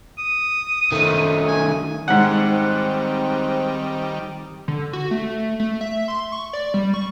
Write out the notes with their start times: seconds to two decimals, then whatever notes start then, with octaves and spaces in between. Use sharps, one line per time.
0.18 D#6
0.92 D#3 A3
1.48 G#5
2.08 G#2 D#3 G3 C4 F#5
4.68 D3
4.93 F#4
5.11 A3
5.60 A3
5.81 E5
6.08 C6
6.32 C#6
6.53 D5
6.74 G3
6.94 C#6